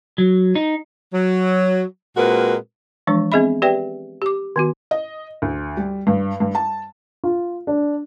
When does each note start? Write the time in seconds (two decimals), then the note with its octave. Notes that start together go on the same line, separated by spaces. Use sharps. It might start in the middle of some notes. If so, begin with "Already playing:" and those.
0.18 F#3
0.55 D#4
1.13 F#3
2.16 A#2 G#3 C4 F#4 A#4 B4
3.07 E3 F3 G#3 D4 C#6
3.32 B3 C4 G#4 D#5 E5 B5
3.62 G4 B4 D5 E5 G5
4.22 G4 D6
4.56 D#3 B3 F#4
4.91 D#5
5.42 D2
5.77 G3
6.07 G2
6.40 G2
6.55 A5
7.24 F4
7.67 D4